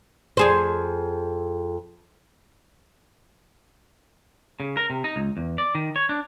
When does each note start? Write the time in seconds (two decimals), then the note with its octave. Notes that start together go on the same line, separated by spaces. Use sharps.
0.37 F2 G#4 C5
4.60 C#3
4.77 A#4
4.90 C3
5.04 D#4
5.16 C#2
5.37 E2
5.58 D5
5.75 D#3
5.96 C#5
6.09 D4